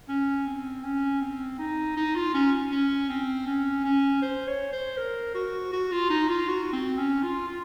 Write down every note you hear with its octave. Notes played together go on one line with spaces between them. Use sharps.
C#4
C4
C#4
C4
D#4
D#4
F4
C#4
C#4
C4
C#4
C#4
C5
C#5
C5
A#4
F#4
F#4
F4
D#4
F4
F#4
C4
C#4
F4
F4